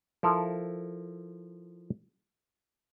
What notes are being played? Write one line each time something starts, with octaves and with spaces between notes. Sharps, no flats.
F3 E4 A4 A#4